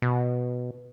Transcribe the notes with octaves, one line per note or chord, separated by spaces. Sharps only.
B2